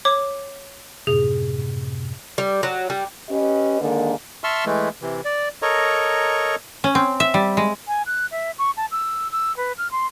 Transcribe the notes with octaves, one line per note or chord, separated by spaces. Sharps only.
C#5 D6
F#2 A2 C3 G#4
G3
F#3
G3
C#4 G4 B4 D#5
D3 D#3 G#3 A#3
E5 A5 C6 C#6 E6 F6
E3 G#3 A3
C3 E3
D5
A4 A#4 C#5 D#5 A#5 C#6
C#4
C4
E5
G3
G#3
G#5
F#6
E5
C#6
A5
E6
E6
B4
F6
C6